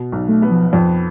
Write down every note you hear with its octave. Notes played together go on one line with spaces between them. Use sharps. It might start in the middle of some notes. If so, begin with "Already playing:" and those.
Already playing: B2
B1
A3
B3
F3
F2 F3